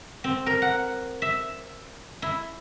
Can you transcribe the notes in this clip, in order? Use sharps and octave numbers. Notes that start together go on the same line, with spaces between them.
C4
A#4
F#5
E5
E4